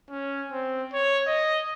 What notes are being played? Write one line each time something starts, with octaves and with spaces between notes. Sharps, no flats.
C#4
C4
C#5
D#5